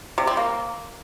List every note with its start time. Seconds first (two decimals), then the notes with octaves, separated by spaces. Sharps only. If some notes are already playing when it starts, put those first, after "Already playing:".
0.18 C3
0.27 C4
0.37 A#3